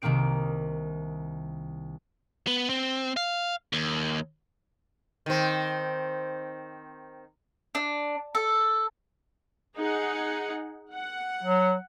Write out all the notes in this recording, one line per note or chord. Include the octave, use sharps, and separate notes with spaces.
C2 C3 D#3 A#3 C4 D7
B3
C4
F5
D#2
D#3 C4
D4
A4
D#4 G#4 F#5
F#5
F#3